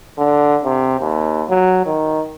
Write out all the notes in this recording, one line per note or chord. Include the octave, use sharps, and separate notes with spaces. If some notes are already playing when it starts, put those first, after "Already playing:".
D3
C3
D#2
F#3
D#3